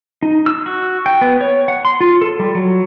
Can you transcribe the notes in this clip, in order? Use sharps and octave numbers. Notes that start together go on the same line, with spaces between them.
D#4
E6
F#4
G5
B3
C#5
F#5
C6
F4
A4
G3
F#3